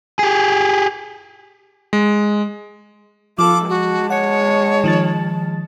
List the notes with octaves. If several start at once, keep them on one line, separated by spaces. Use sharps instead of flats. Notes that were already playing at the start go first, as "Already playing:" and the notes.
G4 G#4
G#3
F3 F4 A4 D6
G#3 F#4 A5
C#5 F#5 C#7
D#3 F3 A6